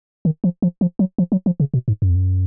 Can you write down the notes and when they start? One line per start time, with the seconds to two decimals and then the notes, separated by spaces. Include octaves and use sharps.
0.25 D#3
0.44 F3
0.62 F3
0.81 F3
0.99 F#3
1.18 F3
1.32 F#3
1.46 F3
1.60 C#3
1.74 B2
1.88 G#2
2.02 F#2
2.10 F2
2.15 F#2